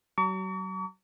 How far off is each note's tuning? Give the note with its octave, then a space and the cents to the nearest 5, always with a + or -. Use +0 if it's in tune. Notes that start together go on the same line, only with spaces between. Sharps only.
F#3 +35 A#5 -35 C#6 +45